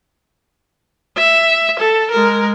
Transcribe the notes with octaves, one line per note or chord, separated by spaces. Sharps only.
E5
A4
G#3 A#4